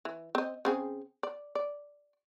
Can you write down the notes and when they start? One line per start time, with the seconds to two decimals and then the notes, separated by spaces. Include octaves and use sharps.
0.05 E3
0.35 C4 D#5
0.65 C#3 C4 G#4
1.23 D5
1.55 D5